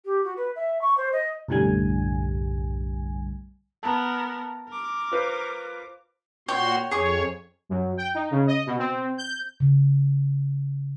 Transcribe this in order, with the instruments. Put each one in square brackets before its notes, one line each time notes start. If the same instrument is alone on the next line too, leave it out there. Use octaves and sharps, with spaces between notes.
[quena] G4
F#4
B4
E5
C#6
C5
D#5
[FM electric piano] B1 F#2 A2 D3 G3 G#5
[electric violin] B3 A#4 [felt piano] A5 A#5
[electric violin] A#4 D6
[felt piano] F4 B4 C5
[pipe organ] A#2 F#4 C6 [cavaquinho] C#5 G5
[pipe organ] F2 C#5 [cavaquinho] G#4 C#6
[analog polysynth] F#2
G5
D#4
C#3
D#5
B2
C4
G6
[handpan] C#3